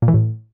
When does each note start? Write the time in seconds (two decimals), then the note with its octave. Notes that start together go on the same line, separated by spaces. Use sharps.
0.02 A#2
0.08 E3
0.14 A2